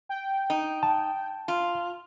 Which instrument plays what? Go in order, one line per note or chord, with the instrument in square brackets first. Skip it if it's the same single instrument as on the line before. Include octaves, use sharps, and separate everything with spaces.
[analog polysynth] G5
[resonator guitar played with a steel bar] D#4
[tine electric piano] A5
[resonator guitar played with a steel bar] F4